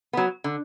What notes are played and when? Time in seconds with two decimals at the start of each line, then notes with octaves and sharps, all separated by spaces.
0.13 F#3 B3
0.44 D3